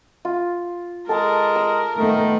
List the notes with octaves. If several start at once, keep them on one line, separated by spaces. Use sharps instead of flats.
F4
G#3 A4 A#4 A5
E6
D#3 A3 B3